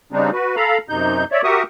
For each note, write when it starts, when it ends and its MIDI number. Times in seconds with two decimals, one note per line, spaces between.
0.12 0.30 49
0.12 0.30 55
0.12 0.30 60
0.12 0.30 62
0.12 0.30 63
0.33 0.56 66
0.33 0.56 71
0.56 0.78 69
0.56 0.78 77
0.56 0.78 82
0.56 0.78 83
0.89 1.24 42
0.89 1.24 48
0.89 1.24 63
0.89 1.24 91
1.31 1.42 73
1.31 1.42 74
1.31 1.42 76
1.44 1.63 66
1.44 1.63 67
1.44 1.63 70
1.44 1.63 76
1.44 1.63 85
1.44 1.63 87